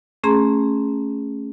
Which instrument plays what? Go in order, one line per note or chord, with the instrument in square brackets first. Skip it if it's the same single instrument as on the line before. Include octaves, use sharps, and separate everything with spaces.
[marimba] A3 C#4 G#4 A#5 C6